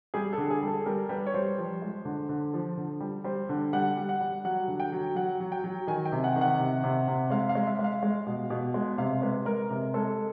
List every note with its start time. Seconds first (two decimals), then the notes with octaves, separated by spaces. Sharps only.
0.14 G3 G#4
0.33 D3 A4
0.51 G#4
0.63 G3 A4
0.86 G3 A#4
1.09 G3 B4
1.26 C#5
1.34 G3 C5
1.58 F3
1.82 G#3
2.05 D3
2.29 D3
2.54 F3
2.77 D3
3.00 G3
3.24 G3 C5
3.49 D3
3.73 G3 F#5
3.97 G3
4.09 F#5
4.21 G3
4.45 F#3 F#5
4.68 D3
4.80 G5
4.92 F#3
5.15 F#3 F#5
5.40 F#3
5.52 G5
5.64 F#3
5.87 D#3 G#5
6.05 G5
6.12 C3
6.24 F#5
6.36 D#3
6.41 F#5
6.59 C3
6.84 C3
7.08 C3
7.30 G#3 F5
7.49 F5
7.55 G#3
7.67 E5
7.79 G#3
7.84 F5
8.03 G#3
8.26 B2
8.50 B2
8.74 G#3
8.98 C3 F5
9.22 G#3 B4
9.45 G#3 A#4
9.70 C3 A#4
9.94 G#3 A4